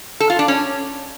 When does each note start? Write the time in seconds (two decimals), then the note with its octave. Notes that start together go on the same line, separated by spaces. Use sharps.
0.20 A4
0.30 F4
0.39 D4
0.48 C#4